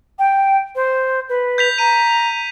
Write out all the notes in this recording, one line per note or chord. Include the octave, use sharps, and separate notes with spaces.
G5
C5
B4
G6 B6 F7
A#5 D#7